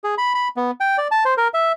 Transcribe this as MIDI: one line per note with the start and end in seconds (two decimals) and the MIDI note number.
0.04 0.15 68
0.18 0.33 83
0.35 0.48 83
0.57 0.71 59
0.80 0.97 79
0.98 1.08 74
1.11 1.24 81
1.25 1.34 72
1.37 1.48 70
1.54 1.72 76